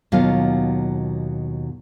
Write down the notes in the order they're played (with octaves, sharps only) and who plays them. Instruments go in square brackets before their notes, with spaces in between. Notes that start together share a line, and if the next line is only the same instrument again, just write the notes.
[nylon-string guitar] D#2 B2 F#3 F4 F5